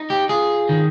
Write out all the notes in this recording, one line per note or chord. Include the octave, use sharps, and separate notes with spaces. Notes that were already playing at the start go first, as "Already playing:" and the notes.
Already playing: D#4
G4
F4 G#4
D#3